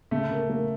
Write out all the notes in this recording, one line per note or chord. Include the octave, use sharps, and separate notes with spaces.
C#3 A3
C#3 A#3
A3 A#3